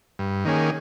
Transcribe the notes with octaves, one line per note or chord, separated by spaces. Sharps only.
G2
D#3 A#3 C#4 G#4